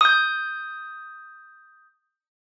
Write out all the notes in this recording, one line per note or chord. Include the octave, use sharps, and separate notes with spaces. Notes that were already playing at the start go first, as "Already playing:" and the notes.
D#6 G6